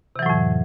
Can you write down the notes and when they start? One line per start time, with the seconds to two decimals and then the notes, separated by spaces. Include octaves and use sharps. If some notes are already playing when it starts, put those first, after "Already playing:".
0.16 C3
0.19 E3
0.23 F#3
0.26 A2
0.30 F2